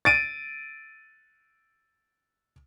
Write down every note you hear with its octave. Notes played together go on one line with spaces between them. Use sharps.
A6 D7 D#7